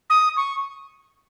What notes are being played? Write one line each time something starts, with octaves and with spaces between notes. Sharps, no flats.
D#6
C#6